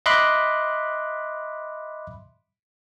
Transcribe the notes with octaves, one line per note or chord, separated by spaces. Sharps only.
D#5 E5 B5 C6 D6 F#6